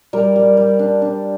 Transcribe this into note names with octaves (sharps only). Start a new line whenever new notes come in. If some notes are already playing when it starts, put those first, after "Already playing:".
G3 A#4
G3
G3
D4
D4